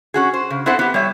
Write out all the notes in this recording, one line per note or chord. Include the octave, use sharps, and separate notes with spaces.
C#4 F#4 G#4
C5
C#3
B3 C4 E4 A4 C5 F#5
B3 G4
G3 C#5 E5